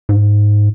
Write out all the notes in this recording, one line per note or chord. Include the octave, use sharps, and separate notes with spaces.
G#2